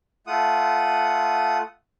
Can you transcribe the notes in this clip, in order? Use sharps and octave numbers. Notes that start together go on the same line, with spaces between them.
A3 F4 F#5 D#6